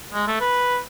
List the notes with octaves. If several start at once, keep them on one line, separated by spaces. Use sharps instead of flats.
G#3
A3
B4